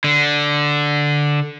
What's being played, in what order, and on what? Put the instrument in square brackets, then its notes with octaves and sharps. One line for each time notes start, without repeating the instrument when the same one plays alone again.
[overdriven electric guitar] D3